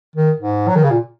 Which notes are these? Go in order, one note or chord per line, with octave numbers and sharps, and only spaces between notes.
D#3
G#2
F#3
D#3
C#3
A#2